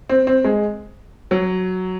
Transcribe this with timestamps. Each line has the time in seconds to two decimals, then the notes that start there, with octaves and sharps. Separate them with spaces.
0.09 C4
0.27 C4
0.45 G#3
1.31 F#3